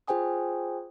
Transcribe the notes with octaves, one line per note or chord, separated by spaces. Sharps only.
F4 G#4 C5 G5 G#5 D#6